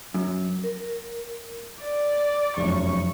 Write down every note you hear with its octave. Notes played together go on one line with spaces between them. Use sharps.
F#2
A#4
D5
F1 F#2 C#6